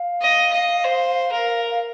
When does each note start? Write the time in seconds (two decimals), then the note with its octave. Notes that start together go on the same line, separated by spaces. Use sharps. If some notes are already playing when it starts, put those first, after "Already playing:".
Already playing: F5
0.22 D#5
0.53 D#5
0.84 C5
1.32 A#4
1.70 F5